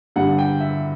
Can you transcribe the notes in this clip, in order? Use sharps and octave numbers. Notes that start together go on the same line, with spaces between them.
G2 D3 G3 F#5
G5
E5